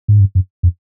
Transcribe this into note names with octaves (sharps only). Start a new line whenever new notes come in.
G#2
G2
F#2
F2